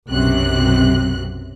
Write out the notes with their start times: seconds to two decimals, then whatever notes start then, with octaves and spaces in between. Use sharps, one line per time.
0.10 B1 F#2 C3 F#6